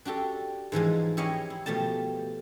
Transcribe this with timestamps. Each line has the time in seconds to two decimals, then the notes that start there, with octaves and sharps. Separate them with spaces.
0.05 D4 F#4 G4 A4
0.72 G#2 E3 F3 G#3
1.17 E4 G4 C#5 D#5 F5 G#5
1.50 E4
1.66 B2 F3 A3 G4 A5